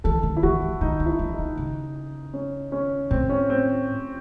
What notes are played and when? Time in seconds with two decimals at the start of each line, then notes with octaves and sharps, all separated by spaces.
0.04 E3 A4
0.23 D#3
0.37 E4
0.43 E3 F#4
0.62 E3
0.81 D#3 D#4
1.00 D#3
1.06 E4
1.19 E3
1.32 D#4
1.39 D#3
1.57 C#3
2.34 C#4
2.72 C#4
3.11 A2 C4
3.29 C#4
3.50 C4